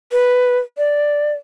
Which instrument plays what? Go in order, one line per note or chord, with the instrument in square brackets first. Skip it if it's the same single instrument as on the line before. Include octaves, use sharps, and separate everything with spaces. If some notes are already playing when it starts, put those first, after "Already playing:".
[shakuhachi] B4
D5